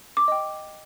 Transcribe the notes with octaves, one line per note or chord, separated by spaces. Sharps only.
D6
D#5 G5